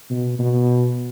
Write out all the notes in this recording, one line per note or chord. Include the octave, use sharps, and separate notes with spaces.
B2
B2